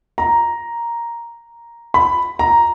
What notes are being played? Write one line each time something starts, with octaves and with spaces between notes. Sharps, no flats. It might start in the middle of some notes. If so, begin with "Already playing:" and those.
A#5
B5
A#5